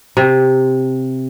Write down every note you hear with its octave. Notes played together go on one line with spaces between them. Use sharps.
C3